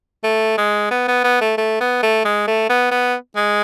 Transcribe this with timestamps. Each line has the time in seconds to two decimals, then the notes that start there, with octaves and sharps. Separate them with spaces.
0.24 A3
0.58 G#3
0.91 B3
1.08 B3
1.24 B3
1.41 A3
1.58 A3
1.81 B3
2.03 A3
2.25 G#3
2.48 A3
2.70 B3
2.91 B3
3.36 G#3